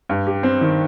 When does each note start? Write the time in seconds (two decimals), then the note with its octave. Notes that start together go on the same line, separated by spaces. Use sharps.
0.09 G2
0.27 G4
0.43 C4
0.61 D#3